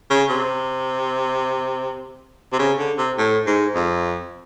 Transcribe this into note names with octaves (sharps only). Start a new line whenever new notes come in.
C#3
C3
C3
C#3
D3
C3
A2
G#2
F2